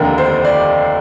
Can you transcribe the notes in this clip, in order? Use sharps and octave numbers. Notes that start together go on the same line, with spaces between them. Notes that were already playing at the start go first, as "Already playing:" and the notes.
Already playing: F1 D#2 D3 A#4
C5
D5